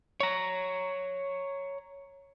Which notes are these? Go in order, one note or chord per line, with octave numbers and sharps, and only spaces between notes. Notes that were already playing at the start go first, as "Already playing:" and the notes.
C#5 A#5